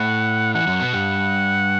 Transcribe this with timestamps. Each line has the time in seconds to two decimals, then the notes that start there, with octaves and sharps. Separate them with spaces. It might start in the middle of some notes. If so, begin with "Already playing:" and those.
Already playing: A2 A3 F#5
0.55 E3 F#5
0.67 F#2 F#3
0.80 B2 B3
0.93 G2 G3